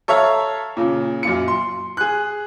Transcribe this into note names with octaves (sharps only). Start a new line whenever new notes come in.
A4 C#5 E5 F5 A#5
A#2 C#3
F#2 A#2 F4 C#7
C6
G#4 F#6